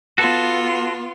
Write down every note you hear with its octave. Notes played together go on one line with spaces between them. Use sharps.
B3 F4 F#4 A4